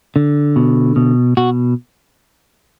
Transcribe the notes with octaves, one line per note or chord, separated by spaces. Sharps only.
D3
B2
B2
B2 F#4